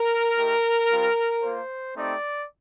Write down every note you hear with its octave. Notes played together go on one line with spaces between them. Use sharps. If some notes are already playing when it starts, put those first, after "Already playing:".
Already playing: A#4
A3 D#4 G4
G3 C4 F4
A#3 F4 C5
A3 C4 D#4 G4 D5